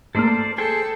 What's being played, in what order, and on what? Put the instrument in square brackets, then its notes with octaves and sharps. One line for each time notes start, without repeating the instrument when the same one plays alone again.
[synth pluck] G#2 A3 A#3 [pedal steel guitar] A4 C5 D5
[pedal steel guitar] G#4 C5 G5 [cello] A4